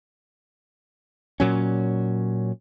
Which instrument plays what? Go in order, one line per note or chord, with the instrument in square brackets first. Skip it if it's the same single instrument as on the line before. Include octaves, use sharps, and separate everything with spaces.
[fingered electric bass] A#2 F#3 C#4